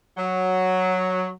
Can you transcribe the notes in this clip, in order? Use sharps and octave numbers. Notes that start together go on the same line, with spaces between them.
F#3